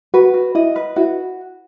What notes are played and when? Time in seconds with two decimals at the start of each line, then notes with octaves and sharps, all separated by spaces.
0.14 F#4 B4
0.34 F#4
0.55 E4 D#5
0.76 B4
0.96 E4 F#4